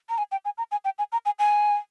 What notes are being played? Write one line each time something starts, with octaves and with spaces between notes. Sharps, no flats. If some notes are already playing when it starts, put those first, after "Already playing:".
A#5
G#5
G5
G#5
A#5
G#5
G5
G#5
A#5
G#5
G#5